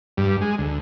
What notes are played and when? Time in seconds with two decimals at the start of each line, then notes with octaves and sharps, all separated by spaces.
0.17 G2
0.41 G#3
0.58 D2